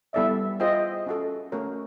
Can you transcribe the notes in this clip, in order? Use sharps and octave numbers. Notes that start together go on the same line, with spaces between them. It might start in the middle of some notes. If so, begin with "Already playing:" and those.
G3 B3 E4 A4 D5 E5
F4 G#4 C5 D#5 E5 G5
C#4 F#4 A4
A3 C#4 F#4 A#4 C#5